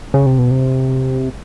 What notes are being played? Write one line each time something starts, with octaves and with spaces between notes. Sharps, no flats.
C#3
C3
B2
C3